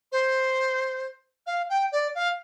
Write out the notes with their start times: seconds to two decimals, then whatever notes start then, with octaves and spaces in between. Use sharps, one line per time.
0.12 C5
1.46 F5
1.69 G5
1.92 D5
2.15 F5